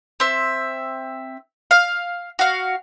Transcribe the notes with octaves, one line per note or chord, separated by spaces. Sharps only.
C4 E5
F5
F#4 F5